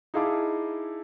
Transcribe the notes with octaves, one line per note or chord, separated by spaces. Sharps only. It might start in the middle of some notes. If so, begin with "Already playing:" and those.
D#4 E4 G#4 F5 A5 D6